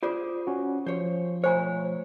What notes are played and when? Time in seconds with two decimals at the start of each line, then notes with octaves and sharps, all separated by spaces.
0.03 F4 G#4 C5 D5
0.47 C#4 F#4
0.87 F3 C5 C#5
1.44 B2 A3 C5 C#5 G#5 A#5